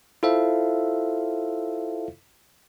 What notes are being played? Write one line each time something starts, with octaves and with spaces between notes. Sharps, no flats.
E4 F4 A4 C5 E5 F5